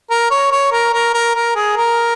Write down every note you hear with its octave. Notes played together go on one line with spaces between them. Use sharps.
A#4
C#5
C#5
A#4
A#4
A#4
A#4
G#4
A#4